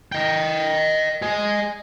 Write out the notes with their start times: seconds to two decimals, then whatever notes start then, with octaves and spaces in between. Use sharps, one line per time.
0.12 D#5 G5
1.22 G#4 D#5